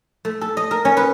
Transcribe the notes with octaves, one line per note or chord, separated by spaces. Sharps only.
A3
A4
D#5
A#4
C#4
B4